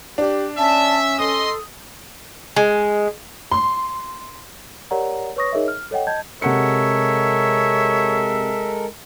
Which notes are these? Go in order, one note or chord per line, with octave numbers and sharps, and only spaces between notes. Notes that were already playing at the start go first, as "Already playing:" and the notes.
D4 G4
C#4 E5 A5
A4 D#5 C6 D#6
G#3
C6
G4 A#4 C#5 D5 F#5 A#5
B4 C#5 C#6 D#6 A#6
D#4 G#4 A#4 C#5 D#5 E5
F6
A4 C#5 D#5 F#5 G5
D#5 A5 G6 G#6
C3 G#3 A4 A#4 C#5 E5 F#5 C#7